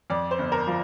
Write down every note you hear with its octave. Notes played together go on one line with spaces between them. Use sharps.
F2 D5
C5
G1
A#4
F3